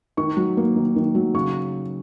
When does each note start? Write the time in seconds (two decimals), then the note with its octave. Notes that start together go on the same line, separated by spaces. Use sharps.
0.17 D#3 C#6
0.37 F#3
0.57 A#3
0.76 D#3
0.96 D#3
1.15 F#3
1.34 C#3 C#6